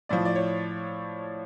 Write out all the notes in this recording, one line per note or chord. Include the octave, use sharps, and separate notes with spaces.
A2 F3 D5
D5
C#5